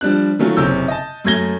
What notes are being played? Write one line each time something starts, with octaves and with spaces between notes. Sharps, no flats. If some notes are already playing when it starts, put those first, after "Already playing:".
F3 G3 D4 F#6
D#3 F#3 A3 C#4 F4
F#1 C3 C#4 E6 G6
D#5 A5
F#2 F#3 A3 G#6 A#6 G7